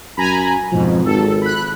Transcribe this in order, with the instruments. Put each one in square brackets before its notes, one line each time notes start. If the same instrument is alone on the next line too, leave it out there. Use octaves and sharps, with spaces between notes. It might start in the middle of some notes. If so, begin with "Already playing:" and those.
[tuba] F#2 [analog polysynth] G#5 A#5 B5
[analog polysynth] F2 G#2 B2 [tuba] F3
[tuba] G#1 [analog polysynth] A4
[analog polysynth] B5 F#6